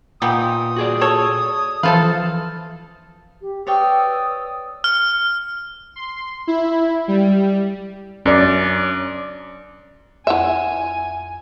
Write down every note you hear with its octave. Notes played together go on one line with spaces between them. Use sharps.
A#2 B3 D#4 G4 D#6
F#4 G#4 D5
A4 C#5
E3 F3 A4 B4 C5 F5 A5
G4
B4 C#5 D5 G5 D#6 E6
F6
C6
E4
G3
F#2 C#4 D5
F2 E4 E5 F#5 G#5